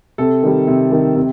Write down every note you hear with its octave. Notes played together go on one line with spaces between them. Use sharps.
C3 A4
D#3 G3
C3
D#3 G3
C3